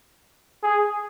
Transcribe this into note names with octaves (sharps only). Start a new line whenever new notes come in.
G#4